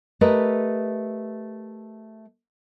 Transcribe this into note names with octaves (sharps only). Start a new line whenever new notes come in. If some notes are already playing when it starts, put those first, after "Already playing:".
A3 G4 A#4 B4 D#5